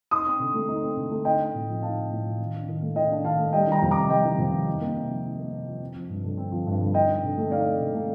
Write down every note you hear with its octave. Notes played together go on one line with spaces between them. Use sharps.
D#4 C6 D#6
C4
D3
A3
D#4
C4
D3
A3
D#4 D#5 G5
C4
A2
F3
D#4 F5 A5
C4
A2
F3
D#3
D4
D#3
A3
D#3 D#5 G5
D4
D#3 F5 A5
A3
G3 D#5 G5
D#3 G5 A#5
F2
C3 A#5 D6
G3 D#5 G5
D#3
F2
C3
D#4
A#3
C3
F3
D#4
A#3
C3
F3
C4
F3
G2
D3
C4
F3
G2
D3
D#4 D#5 G5
C4
D3
A3
D#4 D5 F5
C4
D3
A3